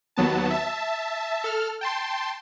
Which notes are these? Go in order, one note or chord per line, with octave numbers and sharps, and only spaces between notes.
D#2 F#3 B3 A5
E5 A5
A4 F6
G5 A5 C6